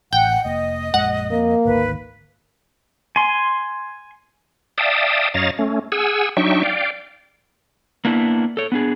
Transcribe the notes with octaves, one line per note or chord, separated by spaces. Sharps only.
A1 F#5 G5
F1 A#3 D#5
A#1 F#2 G#3 F#5
F2 A#3
G#1 D2 D#3 B4
G#5 C6
D5 E5 F5 G5 A5 D#6
F#2 C#5 D#5 F5 A#5 A6
A3 C#4
G#4 F#5 G#5 E6
F#3 D4 D#4 E5 G5 C#6
D5 F5 G5
A#3 B3 D4 E4
A4 C#5
B3 D4 G#4